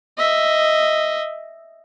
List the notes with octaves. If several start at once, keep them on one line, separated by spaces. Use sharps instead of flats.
D#5 E5